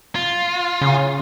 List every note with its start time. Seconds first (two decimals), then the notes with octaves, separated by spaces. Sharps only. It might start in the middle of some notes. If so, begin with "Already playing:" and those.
0.15 F4
0.81 C#3